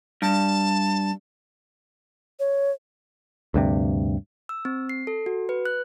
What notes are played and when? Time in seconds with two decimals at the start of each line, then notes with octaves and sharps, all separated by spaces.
0.22 G2 A5
2.40 C#5
3.54 D2 G2 C3
4.49 E6
4.65 C4
4.89 C7
5.07 A4
5.26 F#4
5.49 B4
5.65 F#6